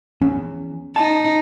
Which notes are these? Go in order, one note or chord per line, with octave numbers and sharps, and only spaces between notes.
E2 C#4
D#4 A5